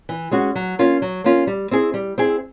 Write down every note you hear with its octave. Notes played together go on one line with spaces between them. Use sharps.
E3
G#3 C#4 F#4
F#3
A#3 C#4 F4
F#3
A#3 C#4 F4
G3
C4 E4 G#4
G3
C4 E4 G#4